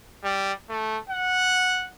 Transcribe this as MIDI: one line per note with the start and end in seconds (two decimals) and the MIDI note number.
0.24 0.52 55
0.69 0.97 57
1.10 1.88 78